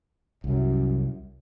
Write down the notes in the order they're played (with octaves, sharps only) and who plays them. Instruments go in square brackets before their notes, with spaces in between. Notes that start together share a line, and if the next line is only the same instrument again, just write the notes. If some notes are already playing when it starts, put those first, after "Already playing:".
[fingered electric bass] C2 [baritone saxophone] F#2